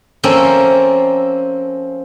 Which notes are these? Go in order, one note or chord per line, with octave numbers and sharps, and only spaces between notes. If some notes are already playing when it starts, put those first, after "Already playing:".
F3 A#3 C4 C#4 A4 E5